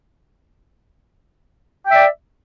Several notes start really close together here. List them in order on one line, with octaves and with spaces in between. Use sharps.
G5 E5 D5